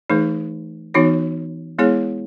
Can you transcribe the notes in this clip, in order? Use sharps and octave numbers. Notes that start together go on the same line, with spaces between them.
E3 A3 D#4 G#4 B4
E3 B3 D#4 F#4 C#5
G#3 B3 E4 G#4 C#5